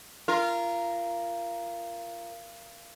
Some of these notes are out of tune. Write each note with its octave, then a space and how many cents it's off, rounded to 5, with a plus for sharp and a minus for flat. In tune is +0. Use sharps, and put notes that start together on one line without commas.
F4 -25 A#4 +0